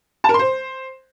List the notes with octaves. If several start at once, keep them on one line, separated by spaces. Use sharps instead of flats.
A5
A#4
C6
C5